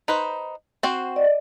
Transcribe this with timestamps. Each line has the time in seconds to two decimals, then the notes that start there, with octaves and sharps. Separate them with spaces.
0.08 D#4 B4 C5
0.83 C4 F#4 C5
1.16 D5 D#5